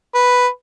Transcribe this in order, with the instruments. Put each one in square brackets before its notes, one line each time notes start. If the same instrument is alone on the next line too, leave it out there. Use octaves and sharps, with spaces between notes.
[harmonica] B4